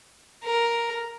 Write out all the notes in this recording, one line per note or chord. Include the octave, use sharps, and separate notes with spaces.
A#4